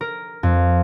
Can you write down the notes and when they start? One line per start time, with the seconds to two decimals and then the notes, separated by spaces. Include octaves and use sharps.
0.01 A#4
0.43 F2